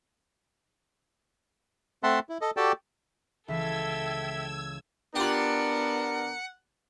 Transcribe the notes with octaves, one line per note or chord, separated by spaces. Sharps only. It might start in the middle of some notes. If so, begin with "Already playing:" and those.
A3 C4 E5 F#5 A5 C6
E4
A4 D#5
F#4 G4 A4 D5 G5 A5
C#2 E3 A4 E5 G5 E6 G#6
B3 D4 F4 G4 A#4 F#5